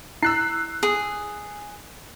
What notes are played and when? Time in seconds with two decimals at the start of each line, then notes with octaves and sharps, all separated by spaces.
0.23 E4 E6 F#6 C7
0.83 G#4